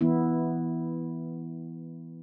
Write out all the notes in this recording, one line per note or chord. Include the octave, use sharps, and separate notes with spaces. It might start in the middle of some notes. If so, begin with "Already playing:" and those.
E3 B3 E4